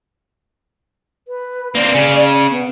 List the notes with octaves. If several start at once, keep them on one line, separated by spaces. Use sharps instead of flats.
B4
A#3 C4 D5
C#3
B3